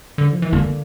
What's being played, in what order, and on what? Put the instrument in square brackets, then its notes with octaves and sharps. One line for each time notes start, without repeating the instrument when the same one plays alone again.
[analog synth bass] D3
F3
E3
[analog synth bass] D3 [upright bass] A#3